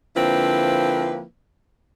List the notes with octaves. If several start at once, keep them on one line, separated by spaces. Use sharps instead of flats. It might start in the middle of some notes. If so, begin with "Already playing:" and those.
D3 F3 A#3 C4 E4 B4